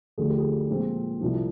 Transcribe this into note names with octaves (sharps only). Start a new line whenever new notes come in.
D2 D3 F3 G#4
G4
G#4
A#2 F3 G#3 C4
C2 C3 F3